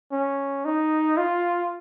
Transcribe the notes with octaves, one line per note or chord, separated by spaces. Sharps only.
C#4
D#4
F4